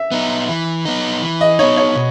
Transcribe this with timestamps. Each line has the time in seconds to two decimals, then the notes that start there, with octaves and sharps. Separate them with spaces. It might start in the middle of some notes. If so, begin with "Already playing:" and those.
Already playing: E5
0.12 B3 D#4
0.49 E3
0.85 B3 D#4
1.22 E3
1.41 D#5
1.59 D#4 C#5
1.62 B3
1.77 C#5
1.96 B2